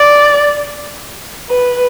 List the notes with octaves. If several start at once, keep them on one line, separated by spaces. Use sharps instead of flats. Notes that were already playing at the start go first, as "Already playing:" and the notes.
Already playing: D5
B4